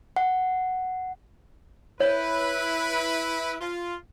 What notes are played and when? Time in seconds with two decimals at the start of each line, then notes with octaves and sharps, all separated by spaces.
0.16 F#5
2.00 E4 B4 C#5
3.61 F4